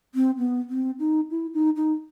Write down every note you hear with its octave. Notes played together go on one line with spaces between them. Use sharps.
C4
B3
C4
D#4
E4
D#4
D#4